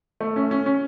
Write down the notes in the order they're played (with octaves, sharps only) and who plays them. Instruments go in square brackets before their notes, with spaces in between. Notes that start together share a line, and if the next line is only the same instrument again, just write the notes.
[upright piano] A3
C#4
C#4
C#4